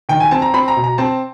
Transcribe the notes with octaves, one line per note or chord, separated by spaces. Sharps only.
D#3 G5
G#5
C4 A5
A#5
C4 B5
A#5
B2
A#5
C4 A5